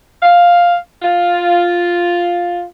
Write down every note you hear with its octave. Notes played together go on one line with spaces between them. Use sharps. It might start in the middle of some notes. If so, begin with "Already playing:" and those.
F5
F4